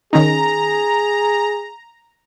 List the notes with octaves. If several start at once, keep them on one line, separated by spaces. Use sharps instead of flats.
D#3 C#4 D#4 G#4 A#5